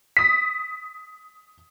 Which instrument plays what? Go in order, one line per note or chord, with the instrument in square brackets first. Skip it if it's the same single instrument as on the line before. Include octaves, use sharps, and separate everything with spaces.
[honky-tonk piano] D#6 B6